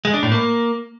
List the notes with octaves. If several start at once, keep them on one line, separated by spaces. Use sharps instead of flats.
G#3
D4
A2
A#3